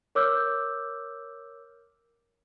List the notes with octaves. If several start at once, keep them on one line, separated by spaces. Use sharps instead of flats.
A#4 C#5 D6 E6 F6 G6